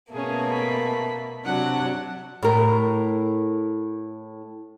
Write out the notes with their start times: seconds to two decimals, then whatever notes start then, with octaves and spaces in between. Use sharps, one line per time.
0.12 B2 A3 A#3 C#4 G#4
0.52 B5
1.45 C3 F#3 D4 F#5
2.43 A2 A#4